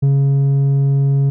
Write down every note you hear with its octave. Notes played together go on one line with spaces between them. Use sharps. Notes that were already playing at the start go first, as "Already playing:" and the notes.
C#3